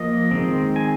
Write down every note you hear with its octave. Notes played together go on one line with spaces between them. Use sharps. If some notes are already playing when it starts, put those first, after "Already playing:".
Already playing: F3 A#3 D#5
D#3 G#3 C4
G#5